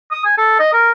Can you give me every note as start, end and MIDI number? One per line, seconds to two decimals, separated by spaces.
0.12 0.21 87
0.25 0.33 80
0.37 0.55 69
0.59 0.71 75
0.73 0.92 70